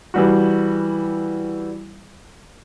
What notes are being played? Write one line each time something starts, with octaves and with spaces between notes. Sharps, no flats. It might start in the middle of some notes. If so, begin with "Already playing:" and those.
E3 G3 F#4